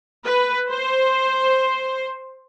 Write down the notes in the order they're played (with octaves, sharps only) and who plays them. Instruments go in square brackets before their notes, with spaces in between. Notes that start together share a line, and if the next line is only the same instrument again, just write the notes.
[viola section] B4
C5